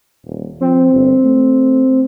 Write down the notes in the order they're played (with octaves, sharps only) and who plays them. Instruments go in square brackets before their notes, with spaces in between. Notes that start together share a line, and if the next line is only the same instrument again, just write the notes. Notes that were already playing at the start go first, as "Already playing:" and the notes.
[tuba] D#1
[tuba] F3 [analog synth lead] C4
[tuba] G1
A3